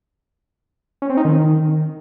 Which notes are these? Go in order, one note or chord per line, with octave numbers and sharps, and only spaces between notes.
C#4
C4
D#4
D#3